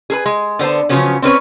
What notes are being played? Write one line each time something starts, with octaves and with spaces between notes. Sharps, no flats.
G#4 A4 B4
G#3
D3 B3 C5 A5
C#3 F3 F#3 B3 C#4
C4 C#4 B4 C#5